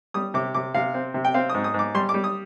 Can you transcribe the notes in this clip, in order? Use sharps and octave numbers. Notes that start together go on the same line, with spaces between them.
G3 D#6
C3 D6
C3 D6
C3 F5
C4
C3
G5
C4 F5
G#2 D#6
D#6
G#2 D6
G3 C6
D6
G3
D#6